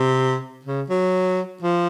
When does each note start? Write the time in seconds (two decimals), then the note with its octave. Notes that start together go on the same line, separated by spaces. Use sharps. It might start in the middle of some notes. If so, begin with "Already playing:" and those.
Already playing: C3
0.65 C#3
0.90 F#3
1.63 F3